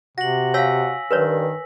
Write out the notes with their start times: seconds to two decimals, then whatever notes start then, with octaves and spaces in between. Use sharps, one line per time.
0.18 C3 F#4 A#6 F#7
0.54 C#5 F5 G#5 E6 B6
1.11 G2 D#3 A#4 B4 C#5